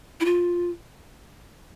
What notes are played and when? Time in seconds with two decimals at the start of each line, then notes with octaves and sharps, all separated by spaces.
0.20 E4
0.25 F4